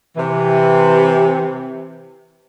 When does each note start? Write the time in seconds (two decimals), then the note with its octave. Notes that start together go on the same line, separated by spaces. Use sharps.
0.17 C3 E3